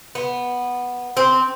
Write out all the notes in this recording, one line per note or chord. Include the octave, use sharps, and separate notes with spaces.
B3
C4